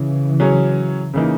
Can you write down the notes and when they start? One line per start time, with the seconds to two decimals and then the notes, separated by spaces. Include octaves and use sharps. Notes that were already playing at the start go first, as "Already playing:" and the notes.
Already playing: C#3 E3
0.40 F#3 C#4 G#4 C#5
1.13 C#3 E3 A#3 D#4